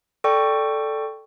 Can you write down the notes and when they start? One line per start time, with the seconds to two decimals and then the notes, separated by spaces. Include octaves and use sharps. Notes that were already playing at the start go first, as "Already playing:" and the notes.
0.24 A4 D5 G5 C#6